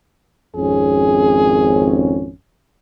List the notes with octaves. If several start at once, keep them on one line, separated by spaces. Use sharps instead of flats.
G#1 F2 C#4 G#4